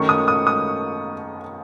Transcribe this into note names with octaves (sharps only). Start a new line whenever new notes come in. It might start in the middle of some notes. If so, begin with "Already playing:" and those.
Already playing: F#2 D#3 A3 C#6
D#6
D#6
D#6